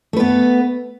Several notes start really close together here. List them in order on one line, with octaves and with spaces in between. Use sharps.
A3 B4 B3